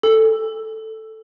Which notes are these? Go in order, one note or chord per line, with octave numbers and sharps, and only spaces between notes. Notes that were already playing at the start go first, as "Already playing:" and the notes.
A4